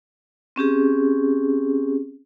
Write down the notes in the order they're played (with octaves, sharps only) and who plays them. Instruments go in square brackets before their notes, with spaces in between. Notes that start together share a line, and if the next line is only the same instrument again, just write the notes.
[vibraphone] C4 C#4 G4 G#4